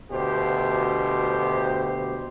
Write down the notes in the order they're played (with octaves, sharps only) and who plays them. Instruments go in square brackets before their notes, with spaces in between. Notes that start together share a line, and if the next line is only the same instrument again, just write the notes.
[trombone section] D2 B2 G4 C5